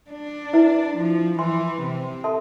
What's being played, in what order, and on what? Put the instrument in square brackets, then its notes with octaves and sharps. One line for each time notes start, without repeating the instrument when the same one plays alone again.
[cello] D4
[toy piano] E4 B4 E5
[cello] F3
[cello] E3 [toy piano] B4 E5 G#5 C6
[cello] C3
[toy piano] A4 E5 A5 C6